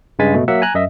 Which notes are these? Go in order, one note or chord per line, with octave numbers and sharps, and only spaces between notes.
G2 C#3 G#3 G#5 A6 B6
B2 A3
F#3 A#3 E5 F#5 E6 B6
G#5 A#5 F#6
F#2 D#5 E5